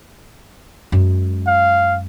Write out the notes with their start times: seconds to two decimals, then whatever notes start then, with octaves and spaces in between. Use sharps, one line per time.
0.92 F#2 G#3
1.47 F5